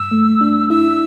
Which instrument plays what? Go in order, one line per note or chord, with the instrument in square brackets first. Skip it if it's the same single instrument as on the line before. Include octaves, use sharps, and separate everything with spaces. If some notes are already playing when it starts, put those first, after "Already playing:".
Already playing: [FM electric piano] G2 [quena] E6
[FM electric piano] A3
D4
[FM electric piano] E4 [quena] E6